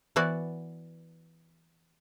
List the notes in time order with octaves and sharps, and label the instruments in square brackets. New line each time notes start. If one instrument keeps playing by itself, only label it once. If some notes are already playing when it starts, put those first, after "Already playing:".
[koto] E3 B3 E4 F#4 D5